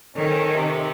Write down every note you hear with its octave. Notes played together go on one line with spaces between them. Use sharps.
D#3 C4 C#4 A4
C3